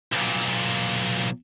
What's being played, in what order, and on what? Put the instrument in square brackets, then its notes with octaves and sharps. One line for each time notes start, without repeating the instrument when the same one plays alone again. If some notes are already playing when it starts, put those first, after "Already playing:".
[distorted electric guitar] B1 A#2